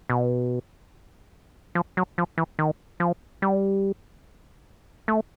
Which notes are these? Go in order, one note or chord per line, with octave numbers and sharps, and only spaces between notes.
B2
F3
F#3
F3
E3
D#3
F3
G3
A3